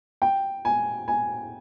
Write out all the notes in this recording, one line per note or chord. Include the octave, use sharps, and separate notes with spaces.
G5
G#5
G#5